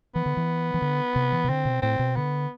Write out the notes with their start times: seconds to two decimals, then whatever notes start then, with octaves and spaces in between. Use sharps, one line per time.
0.15 E3 B3
0.26 D3
0.37 E3
0.74 E3
0.82 D3
1.16 C3
1.32 E3
1.44 C3
1.49 D3 C4
1.65 B2
1.82 A2 C4
1.99 B2
2.16 D3 B3